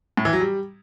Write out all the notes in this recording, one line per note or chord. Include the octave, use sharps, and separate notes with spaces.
A2
E3
F#3
G3